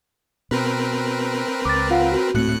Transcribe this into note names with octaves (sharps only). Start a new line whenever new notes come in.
B2 C4 A#4 B4
C#2 D6 A6
F4 F5 F#5
F#4
D1 A2 A3 C4 F#6 C#7